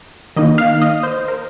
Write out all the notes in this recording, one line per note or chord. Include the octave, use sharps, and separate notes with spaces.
D#3 A#3 D#4 D#5
F5
D#5
C5
A#4